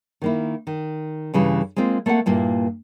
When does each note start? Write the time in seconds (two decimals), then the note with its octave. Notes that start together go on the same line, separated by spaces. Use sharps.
0.22 D#3 A#3 E4
0.67 D#3
1.34 G2 C#3 E3 G3
1.76 G#3 A#3 C4 F4
2.06 A3 A#3 C4 B4 F#5
2.26 G2 A#2 A#3 E4